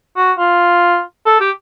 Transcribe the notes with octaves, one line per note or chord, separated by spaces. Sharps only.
F#4
F4
A4
G4